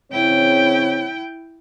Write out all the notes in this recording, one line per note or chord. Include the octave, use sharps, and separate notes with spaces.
C#3 C4 E4 C#5 G5